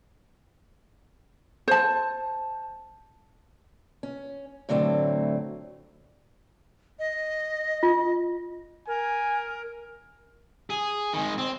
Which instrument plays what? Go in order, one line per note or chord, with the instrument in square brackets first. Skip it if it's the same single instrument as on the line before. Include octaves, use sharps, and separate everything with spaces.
[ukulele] C5 A5
[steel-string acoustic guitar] C#4
A2 D3 F#3 A3 C4
[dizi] D#5
[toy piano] F4
[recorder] A#4 [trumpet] G#5
[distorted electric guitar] G#4
D#3 G#3
C4